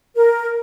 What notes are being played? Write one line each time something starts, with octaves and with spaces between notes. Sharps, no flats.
A#4